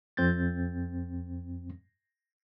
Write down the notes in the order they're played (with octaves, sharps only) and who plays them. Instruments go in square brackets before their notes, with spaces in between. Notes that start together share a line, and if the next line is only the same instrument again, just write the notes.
[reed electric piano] F2 C4 G6 A6